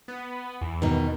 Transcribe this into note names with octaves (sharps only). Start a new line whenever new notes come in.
B3
E2
B2 D#3